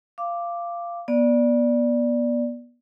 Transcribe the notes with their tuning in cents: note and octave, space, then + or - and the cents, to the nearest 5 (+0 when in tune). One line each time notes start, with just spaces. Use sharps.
F5 -15 D6 +0
B3 -30 D5 +0